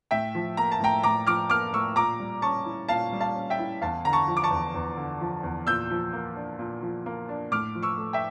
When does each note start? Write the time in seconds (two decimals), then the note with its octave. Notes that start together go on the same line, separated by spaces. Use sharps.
0.11 A2 E5 G5
0.35 F3
0.57 A#3 A#5
0.72 A5
0.80 A2 G5 A#5
1.03 A2 A#5 D6
1.27 F3 D6 F6
1.50 A#3 D6 F6
1.73 A2 C#6 E6
1.96 A#2 A#5 D6
2.20 G3
2.42 C#4 A5 C#6
2.66 E4
2.88 A#2 F5 A5
3.12 G3
3.21 F5 A5
3.35 C#4
3.50 E5 G5
3.59 E4
3.81 E2 F5 A5
4.05 D3 A#5
4.13 A5 C#6
4.28 F3
4.37 D6
4.43 A5 C#6
4.51 E2
4.74 E2
4.97 D3
5.21 F3
5.43 E2
5.67 A#2 E6 G6
5.91 F3
6.13 A#3
6.36 D4
6.59 A#2
6.82 F3
7.06 A#3
7.29 D4
7.52 A2 D6 F6
7.75 F3
7.83 C#6 E6
7.98 A3
8.13 E5 G5